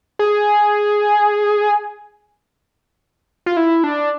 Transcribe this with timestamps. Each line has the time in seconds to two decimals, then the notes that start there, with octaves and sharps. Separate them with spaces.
0.19 G#4
3.46 F4
3.57 E4
3.84 D4